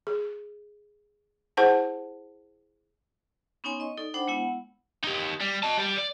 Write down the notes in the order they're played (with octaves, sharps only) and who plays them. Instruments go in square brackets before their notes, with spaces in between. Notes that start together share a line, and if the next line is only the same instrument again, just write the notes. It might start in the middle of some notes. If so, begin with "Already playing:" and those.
[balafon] G#4
E4 G#4 C5 F#5 A5
[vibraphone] B3 C#4 D#4 C#5 G#5 C6
D#5 C#6
D#4 A4 D5
D4 C5 F#5 G5 B5
G#3 B3 E4 F#5
[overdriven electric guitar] D#4 G4
G3
D#5 A5
G3 D5
D5